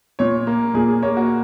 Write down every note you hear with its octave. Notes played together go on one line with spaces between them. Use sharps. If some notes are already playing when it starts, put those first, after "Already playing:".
A#2 C#5
A#3
A#2 G#4
G#4
A#3 C#5
F#4